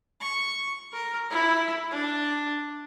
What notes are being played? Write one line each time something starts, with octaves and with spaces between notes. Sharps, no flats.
C#6
A#4
E4
D4